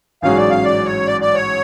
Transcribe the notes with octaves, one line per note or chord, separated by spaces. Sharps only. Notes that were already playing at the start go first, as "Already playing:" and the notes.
A1 G#2 F#3 C#4 G#4 F5
D5
F5
D5
C#5
D5
D5
C#5